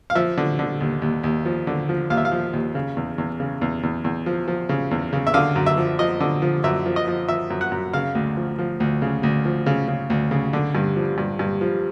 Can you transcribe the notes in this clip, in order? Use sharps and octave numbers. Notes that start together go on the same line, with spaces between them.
F5
F3 E5
D3
D3
D#2
D#2
D#2
F3
D3
F3
D#2 F5
E5
F5
F3
D#2
C#3
E2
E2
C#3
E2
E2
E2
F3
F3
C#3
E2
C#3
E5
D3 F5
F#2
E5
F3
F3 D#5
D3
F3
F#2 E5
F3
D#5
F3
F3 E5
F#2
F#5
F#2
C#3 F5
D2
F3
F3
D2
C#3
D2
F3
C#3
C#3
D2
C#3
D3
G2
F3
G2
G2
F3